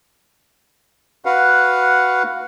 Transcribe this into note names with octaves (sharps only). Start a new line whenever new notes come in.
F#4 B4 F5 F#5